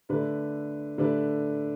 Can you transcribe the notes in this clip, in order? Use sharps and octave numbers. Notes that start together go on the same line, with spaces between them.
D3 A3 D4 B4
D3 A3 D4 B4